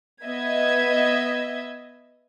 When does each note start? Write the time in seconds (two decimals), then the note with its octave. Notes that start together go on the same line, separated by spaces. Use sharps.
0.24 B3 D#5 E5 G#6